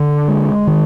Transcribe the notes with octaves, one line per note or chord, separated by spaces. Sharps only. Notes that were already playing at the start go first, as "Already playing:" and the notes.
Already playing: D3
G#3
D#3